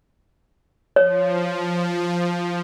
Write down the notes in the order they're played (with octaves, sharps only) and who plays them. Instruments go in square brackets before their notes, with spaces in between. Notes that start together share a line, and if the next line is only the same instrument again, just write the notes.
[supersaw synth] F3 [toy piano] C#5